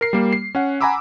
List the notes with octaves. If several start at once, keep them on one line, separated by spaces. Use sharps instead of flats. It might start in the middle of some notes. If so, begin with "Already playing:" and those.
A#4 C7
G3 A#3
C7
C#4 F#5
F#5 G#5 A#5 B5 D6 E6